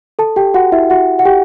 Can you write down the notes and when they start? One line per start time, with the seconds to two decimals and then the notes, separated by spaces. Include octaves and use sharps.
0.19 A4 A5
0.36 G4 G5
0.54 F#4 F#5
0.72 E4 E5
0.90 F#4 F#5
1.19 F#5
1.25 G4 G5